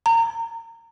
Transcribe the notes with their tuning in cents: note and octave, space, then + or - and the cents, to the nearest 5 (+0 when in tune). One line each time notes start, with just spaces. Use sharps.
A#5 -25